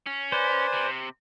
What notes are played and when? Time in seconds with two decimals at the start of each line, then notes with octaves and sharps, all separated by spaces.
0.06 C#4
0.32 B4 C5 D5 G#5
0.73 C3